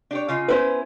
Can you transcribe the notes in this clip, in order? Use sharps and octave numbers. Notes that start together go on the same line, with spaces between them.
D4 G4 C#5
C#3 F4 D#5
B3 C#4 E4 B4 C5